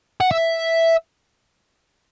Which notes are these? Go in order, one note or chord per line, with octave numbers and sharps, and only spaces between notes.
F#5
E5